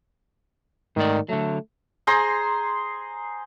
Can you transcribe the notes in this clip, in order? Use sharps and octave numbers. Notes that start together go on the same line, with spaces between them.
G#2 D#3 A3 D5
D3 F#3 A3
G#4 C5 A#5 C6